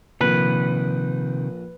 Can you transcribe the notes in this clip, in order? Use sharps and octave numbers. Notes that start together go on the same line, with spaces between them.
A#1 C3 D#3 B4